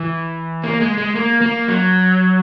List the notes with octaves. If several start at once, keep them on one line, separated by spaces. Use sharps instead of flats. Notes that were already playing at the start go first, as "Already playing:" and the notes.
Already playing: E3
A#3
G#3
G#3
A#3
A#3
F#3